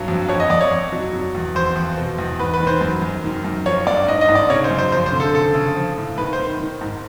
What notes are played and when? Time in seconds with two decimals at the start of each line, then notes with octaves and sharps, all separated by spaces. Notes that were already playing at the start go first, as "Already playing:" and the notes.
Already playing: G2 F#3
0.08 F2
0.29 F2 C#5
0.40 D#5
0.50 F2 D5
0.61 C#5
0.71 F2
0.92 F#3
1.13 F#3
1.35 E2
1.55 F2 C5
1.76 F2
1.98 B2
2.18 E2
2.39 G#2 B4
2.54 B4
2.60 D#3
2.67 C5
2.81 F#2
3.02 F#2
3.24 D#3
3.44 F#2
3.66 F3 C#5
3.87 G2 D5
4.08 G#2 D#5
4.21 D#5
4.29 G#2
4.35 D5
4.50 C#3 C#5
4.64 C5
4.71 F#2
4.78 C5
4.92 F3 C5
5.06 C5
5.12 D3
5.20 A4
5.34 C#3 A4
5.55 C#3
5.76 F3
5.97 A2
6.18 D#3 B4
6.33 C5
6.39 D#3
6.60 D#3
6.81 G#2